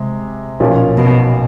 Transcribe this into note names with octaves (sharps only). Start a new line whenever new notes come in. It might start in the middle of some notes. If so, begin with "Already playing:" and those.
Already playing: C3 G#3
B1 A#2 F3 A#3 C#4
B2